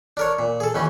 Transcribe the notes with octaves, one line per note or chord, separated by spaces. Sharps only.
D4 A#4 C#5
A#2
G#4 A4
D#2 D#3 E3 C#4